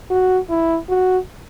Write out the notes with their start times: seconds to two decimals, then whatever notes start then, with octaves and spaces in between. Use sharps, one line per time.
0.10 F#4
0.50 E4
0.90 F#4